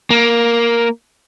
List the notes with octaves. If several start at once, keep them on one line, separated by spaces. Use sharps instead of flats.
A#3